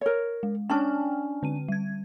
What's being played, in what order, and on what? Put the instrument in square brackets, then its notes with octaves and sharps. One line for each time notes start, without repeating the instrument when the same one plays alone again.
[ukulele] A#4 C#5
[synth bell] G#3
[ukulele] C#4 D4 [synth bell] G5 A5 F6
[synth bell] D3 C4 D#7
G3 G#6